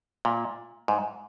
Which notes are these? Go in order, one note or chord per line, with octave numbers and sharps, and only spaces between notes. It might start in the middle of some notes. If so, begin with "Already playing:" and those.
A#2
G#2